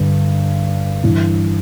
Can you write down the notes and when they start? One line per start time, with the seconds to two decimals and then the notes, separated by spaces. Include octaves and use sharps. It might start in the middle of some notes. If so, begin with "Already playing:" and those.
Already playing: G2 D3
1.03 G2 E3